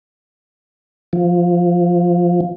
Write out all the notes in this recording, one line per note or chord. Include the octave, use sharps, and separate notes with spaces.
F3